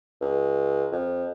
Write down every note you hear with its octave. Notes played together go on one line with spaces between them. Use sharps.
C#2
F2